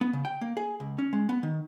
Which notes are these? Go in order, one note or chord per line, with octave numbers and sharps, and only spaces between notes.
B3
C#3
G5
A#3
G#4
C#2
C#4
G#3
B3
D#3